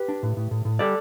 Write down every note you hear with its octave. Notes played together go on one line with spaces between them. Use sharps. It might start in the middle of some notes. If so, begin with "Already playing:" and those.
Already playing: G4 B4
D4
A2
A2
A2
A2
G3 A4 D5